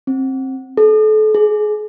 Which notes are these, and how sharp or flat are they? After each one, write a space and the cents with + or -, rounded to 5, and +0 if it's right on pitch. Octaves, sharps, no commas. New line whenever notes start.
C4 +20
A4 -35
G#4 +25